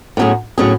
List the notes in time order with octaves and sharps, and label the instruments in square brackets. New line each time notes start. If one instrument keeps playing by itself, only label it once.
[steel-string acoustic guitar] A2 F#3 C#4 G#4
A2 F#3 C#4 G#4